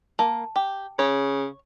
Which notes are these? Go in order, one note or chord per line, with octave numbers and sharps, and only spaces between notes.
A#3 A5
G4
C#3 C#5